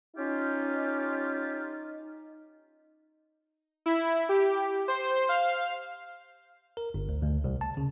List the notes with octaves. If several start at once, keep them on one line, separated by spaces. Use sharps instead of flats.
C#4 D#4 F4 G4
E4
G4
C5
F5
A#4
G1
D2
D2
C2
A5
C#3